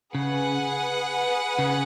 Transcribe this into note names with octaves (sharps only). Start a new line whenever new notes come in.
C#3 G#4 B4 F#5
C#3